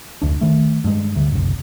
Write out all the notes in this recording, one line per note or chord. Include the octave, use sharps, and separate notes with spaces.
F1 D2 D4
D#3 A3
G2 G#3
D2 D3
F#1 C2